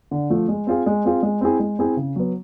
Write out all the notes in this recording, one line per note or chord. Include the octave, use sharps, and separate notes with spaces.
D3
F3 A3
G#3
C4 F4 G#4
G#3
C4 F4 G#4
G#3
C4 E4 G#4
G#3
C4 E4 G#4
C#3
F#3 B3